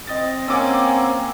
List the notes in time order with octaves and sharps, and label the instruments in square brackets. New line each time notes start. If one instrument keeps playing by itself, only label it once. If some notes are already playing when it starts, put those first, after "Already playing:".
[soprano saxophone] C4 [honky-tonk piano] D#5 A6
[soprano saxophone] A#3 [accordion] C4 [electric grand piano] C#4 F#5 [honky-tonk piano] G#5 D6 E6